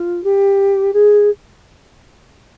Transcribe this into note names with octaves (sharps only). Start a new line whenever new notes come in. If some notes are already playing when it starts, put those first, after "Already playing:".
Already playing: F4
G4
G#4